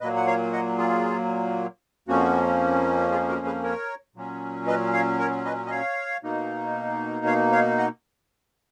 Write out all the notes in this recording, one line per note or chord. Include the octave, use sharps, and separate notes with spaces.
A#2 F#3 A#3 B4 D#5
F#5
C#5 F5
D#5 F#5
F4 G#4
F2 F3 A#3 C#4 F#4
F4 G#4
F#4 A#4
G#4 B4
A#4 C#5
A#2 F#3 C#4
B4 D#5
C#5 F5
A#4 C#5
B4 D#5
D#5
C#5 F5
B2 A#3 D#4
C#5 F5
C#5 F5
D#5 F#5